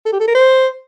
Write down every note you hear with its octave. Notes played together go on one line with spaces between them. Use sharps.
A4
G4
A4
A#4
C5